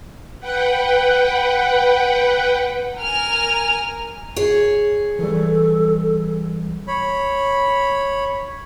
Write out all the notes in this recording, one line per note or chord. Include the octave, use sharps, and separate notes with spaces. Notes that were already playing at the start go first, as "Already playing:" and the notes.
B4 F#5 G5
A#4 G#5 F6
G#4 C#5
E3 G3 A4
C#5 B5